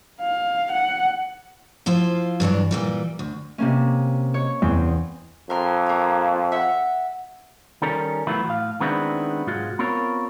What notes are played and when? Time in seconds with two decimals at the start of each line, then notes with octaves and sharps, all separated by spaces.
0.21 F5
0.72 F#5
1.86 F3 E4 F4 C5
2.40 G2 E3 F#3 D4
2.71 A#2 E3 G3
3.19 D2
3.58 C3 A#3 C#4
4.34 C#5
4.62 E2 C4
5.50 F2 A#4 C6
5.86 A#3 F5
6.52 E5 F#5
7.82 D#3 G3 C#4 A4 A#4
8.27 E3 F#3 A3 B3 E4 F4
8.47 A2 F5
8.80 D#3 G#3 B3 C4 D4 E4
9.47 B1 G#2 G#3 F4 F#4
9.79 B3 C4 F4 A#4 C#5